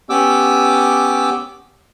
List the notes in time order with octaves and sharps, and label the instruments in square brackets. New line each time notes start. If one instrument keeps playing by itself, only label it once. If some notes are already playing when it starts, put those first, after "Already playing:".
[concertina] B3 C#4 G4 D6 E6